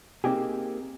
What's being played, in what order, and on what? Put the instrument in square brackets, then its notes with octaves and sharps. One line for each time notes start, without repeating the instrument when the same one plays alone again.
[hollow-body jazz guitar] A#3 C4 D#4 G4 G#4